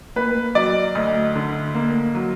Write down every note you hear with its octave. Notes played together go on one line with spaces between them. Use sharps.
A#3 B4
F#3 D5
D2 D#5
D3
A#3
F#3